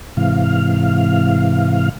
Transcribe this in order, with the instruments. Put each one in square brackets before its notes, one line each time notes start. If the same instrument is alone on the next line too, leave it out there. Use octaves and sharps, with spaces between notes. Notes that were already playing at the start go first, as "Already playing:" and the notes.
[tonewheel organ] G#2 C3 E3 F5